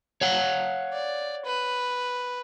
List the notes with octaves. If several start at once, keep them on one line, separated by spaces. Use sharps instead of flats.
C#5 F5 F#5
D5
B4